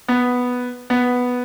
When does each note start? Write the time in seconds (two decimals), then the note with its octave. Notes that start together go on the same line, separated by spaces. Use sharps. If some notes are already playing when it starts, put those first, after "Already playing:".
0.08 B3
0.90 B3